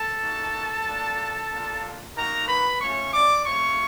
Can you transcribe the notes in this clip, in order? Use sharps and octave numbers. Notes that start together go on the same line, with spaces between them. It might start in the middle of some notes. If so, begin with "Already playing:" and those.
Already playing: A4 A5
A#3 D#4 F#4
A#3 D4 F4
A#3 D4 F4
A#3 D#4 F#4 A#4 A#5
B4 B5
A3 C#4 F4 C#5 C#6
D5 D6
A3 C4 F4 C#5 C#6